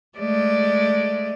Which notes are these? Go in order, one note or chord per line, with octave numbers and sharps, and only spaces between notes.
G#3 A3 D5